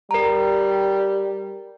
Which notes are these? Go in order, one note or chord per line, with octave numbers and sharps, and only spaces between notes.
G3 A#4 A#5